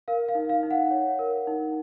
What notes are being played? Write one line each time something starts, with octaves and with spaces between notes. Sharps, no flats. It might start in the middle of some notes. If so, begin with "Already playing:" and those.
A#4 F5
F5
D#4
F5
D#4
F#5
C#5
A#4
D#4